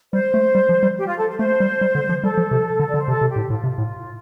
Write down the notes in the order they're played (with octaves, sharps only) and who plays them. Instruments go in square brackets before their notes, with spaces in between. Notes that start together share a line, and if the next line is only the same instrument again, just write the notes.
[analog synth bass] G3 [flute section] C5
[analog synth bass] A3
G3
F3
G3
[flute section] G4
F4
A4
C5
[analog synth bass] A3 [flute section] C5
[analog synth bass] G3
G3
D3
F3
[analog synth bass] G3 [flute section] A4
[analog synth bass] F3
C3
D3
[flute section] D5
[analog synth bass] D3
[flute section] C5
[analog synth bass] C3 [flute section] A4
[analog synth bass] C3
[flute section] G4
[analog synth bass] A2
[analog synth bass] A2 [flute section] F4
[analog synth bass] C3
A2